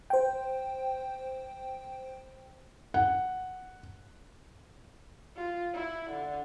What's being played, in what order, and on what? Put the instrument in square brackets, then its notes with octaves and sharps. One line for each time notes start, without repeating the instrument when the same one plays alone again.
[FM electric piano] C5 G5
[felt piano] F#5
[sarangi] F4
E4
D3